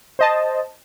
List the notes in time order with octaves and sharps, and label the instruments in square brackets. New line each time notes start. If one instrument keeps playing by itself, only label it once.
[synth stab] C5 D#5 A5